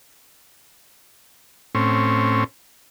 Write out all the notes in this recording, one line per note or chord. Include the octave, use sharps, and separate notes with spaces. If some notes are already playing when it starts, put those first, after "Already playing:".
A2 C4 C#4